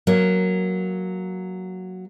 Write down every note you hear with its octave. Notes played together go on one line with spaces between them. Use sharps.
F#3 A#3